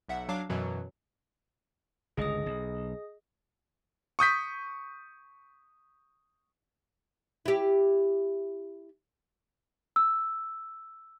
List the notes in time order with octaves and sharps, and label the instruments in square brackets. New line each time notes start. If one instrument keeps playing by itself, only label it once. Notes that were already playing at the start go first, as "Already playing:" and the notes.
[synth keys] B1 E5 F#5
F#3 D4 F5 D6
F#2 B2 E3 F#3
[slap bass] G1 C#2 G2 [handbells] G#4 D#5 D#6
[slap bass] B1
[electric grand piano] C#6 D#6 G6 B6
[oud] E4 G4
[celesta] E6